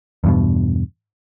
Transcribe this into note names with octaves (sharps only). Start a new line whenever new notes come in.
E2 G2 B2